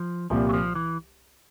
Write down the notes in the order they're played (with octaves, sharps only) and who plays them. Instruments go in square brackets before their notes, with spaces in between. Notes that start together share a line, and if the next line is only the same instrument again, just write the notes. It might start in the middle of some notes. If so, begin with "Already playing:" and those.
Already playing: [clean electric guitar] F3
[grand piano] C2 A#2 G3 [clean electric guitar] F3
[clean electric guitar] F#3
F3
E3